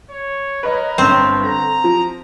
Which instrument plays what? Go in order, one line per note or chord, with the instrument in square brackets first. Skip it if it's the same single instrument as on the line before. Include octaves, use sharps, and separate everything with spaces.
[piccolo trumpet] C#5
[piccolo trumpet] A#4 [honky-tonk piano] B4 C#5 D#5
[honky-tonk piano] G1 G2 [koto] C4
[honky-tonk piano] D3 [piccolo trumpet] A#5
[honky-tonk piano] F3